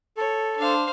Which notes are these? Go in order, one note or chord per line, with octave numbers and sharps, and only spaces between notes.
A4 C#5
D4 C5 F5